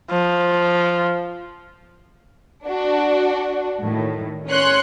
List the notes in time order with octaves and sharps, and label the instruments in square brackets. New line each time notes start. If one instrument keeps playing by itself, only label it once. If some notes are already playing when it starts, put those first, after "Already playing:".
[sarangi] F3
[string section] D4 F#4
A2 D#3
C#4 C#5 C6 F#6 C#7